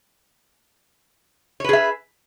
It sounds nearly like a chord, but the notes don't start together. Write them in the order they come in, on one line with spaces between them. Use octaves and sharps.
C#5 B4 G#4 E5